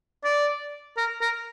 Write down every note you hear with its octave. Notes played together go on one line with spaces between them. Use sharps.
D5
A#4
A#4